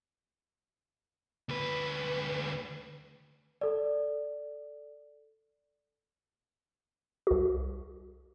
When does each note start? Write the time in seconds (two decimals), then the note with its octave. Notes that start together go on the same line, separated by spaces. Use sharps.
1.49 D2 B4
3.61 A4 D5
7.27 C2 F#4